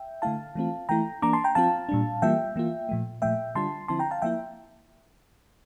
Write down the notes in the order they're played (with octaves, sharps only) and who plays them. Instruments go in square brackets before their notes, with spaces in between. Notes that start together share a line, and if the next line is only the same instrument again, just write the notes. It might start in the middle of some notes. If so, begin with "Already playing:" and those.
Already playing: [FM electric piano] E5 G5
D3 A3 E4 F5 A5
E3 A3 C4 F4
E3 A3 E4 G5 A#5
E3 A#3 D4 A#5 D6
A5 C6
G5 A#5
F3 C4 F4 F5 A5
A#2 G3 D4
E3 G3 A#3 F4 E5 G5
E3 A#3 F4
A#2 F3 A3
A#2 F3 A3 E5 G5
D3 G3 D4 F4 A5 C6
D3 F3 C4 E4 A5 C6
G5 A#5
F5 A5
F3 A#3 E4 E5 G5